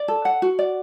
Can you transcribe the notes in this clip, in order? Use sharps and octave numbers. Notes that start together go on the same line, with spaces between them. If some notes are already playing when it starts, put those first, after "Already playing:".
Already playing: D5
A4
F#5
F#4
D5